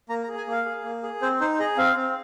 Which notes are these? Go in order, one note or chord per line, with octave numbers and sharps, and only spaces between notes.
A#3 A#5
A#5
G#4
G#5
A#3 F5
G#4
A#3
G#4
C4 C5
D#4 C5
G#4 D#5
C4 F5
C4